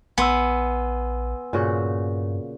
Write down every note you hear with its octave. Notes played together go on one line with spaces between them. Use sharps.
A#1 B3 G#5 C6 E6
G2 A#2 C#3 F#4